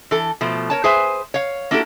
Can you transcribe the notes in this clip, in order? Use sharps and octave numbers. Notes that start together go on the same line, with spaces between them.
E3 A4
B2 F3 A3
A#4 C#5 A5
G#4 B4 C5 E5 G#5
C#5 F5
A#3 D4 E4 F#4 G4 A4